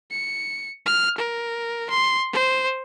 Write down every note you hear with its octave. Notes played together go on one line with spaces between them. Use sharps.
C#7
F6
A#4
C6
C5